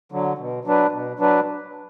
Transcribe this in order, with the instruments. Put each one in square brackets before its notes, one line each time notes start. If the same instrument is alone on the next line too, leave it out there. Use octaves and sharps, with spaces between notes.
[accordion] D3 F#3
B2
F#3 D4 B4
B2
F#3 D4 B4